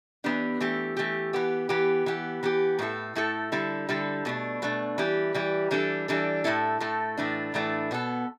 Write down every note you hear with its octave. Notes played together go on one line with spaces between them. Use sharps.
E3 B3 D4 G4
E3 A3 G4
E3 A3 G4
E3 B3 G4
E3 B3 G4
E3 B3 G4
E3 B3 G4
A2 A3 E4 A4
A2 A3 E4 A4
D3 G3 E4 A4
D3 G3 E4 A4
B2 A3 D4
B2 A3 D4
E3 G3 E4 G4
E3 G3 E4 G4
E3 G3 D4 A4
E3 G3 D4 A4
A2 A3 E4 A4
A2 A3 E4 A4
A2 E3 A3 D4
A2 E3 A3 D4
B2 B3 D4 A4